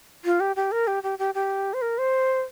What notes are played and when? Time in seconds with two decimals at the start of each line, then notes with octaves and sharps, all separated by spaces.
0.25 F4
0.40 G4
0.56 G4
0.72 A#4
0.87 G4
1.03 G4
1.19 G4
1.35 G4
1.74 C5
1.82 A#4
1.98 C5